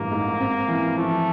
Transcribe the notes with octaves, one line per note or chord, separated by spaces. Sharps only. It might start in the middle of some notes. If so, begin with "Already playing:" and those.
Already playing: A1 G2 A#3
G#2
C4
E3
F3 A3